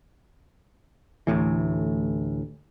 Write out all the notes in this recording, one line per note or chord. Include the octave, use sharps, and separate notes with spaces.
A1 D2 A2 E3